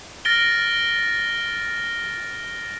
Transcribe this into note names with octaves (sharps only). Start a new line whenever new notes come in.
F6 A6 A#6 D7 G7